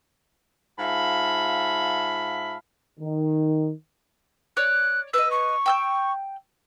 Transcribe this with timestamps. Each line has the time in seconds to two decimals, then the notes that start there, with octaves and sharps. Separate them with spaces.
0.79 G#2 F4 E5 F5 A5 B5
2.99 D#3
4.57 C#5 D5 F#6
5.14 B4 D#5 E6
5.31 C#6
5.66 G5 E6 G6